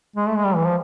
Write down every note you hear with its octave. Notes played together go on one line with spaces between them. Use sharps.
G#3
A3
G#3
G3
E3
F3